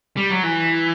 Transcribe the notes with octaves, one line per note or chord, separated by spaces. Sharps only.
G3
F#3
E3